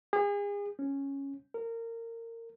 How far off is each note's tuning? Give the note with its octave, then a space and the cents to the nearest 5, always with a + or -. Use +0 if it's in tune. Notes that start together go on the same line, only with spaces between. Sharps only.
G#4 -35
C#4 -5
A#4 -25